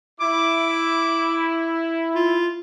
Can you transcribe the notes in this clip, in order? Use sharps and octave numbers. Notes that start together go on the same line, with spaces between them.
E4 D6
F4